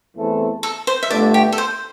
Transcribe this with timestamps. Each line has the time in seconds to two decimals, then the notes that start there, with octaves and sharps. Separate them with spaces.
0.15 E2 E3 A3 C4 A4
0.63 A4
0.87 C5
1.03 E5
1.10 G1 G2 D3 A3 D5
1.34 G4
1.52 A4
1.58 C5